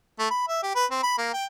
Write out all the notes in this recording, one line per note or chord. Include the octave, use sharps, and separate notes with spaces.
A3
B5
E5
G4
B4
C4
B5
A#3
G5